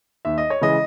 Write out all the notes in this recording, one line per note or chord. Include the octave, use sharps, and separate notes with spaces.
D#2 E5
D#5
C#5
C#3 E3 G#3 D#5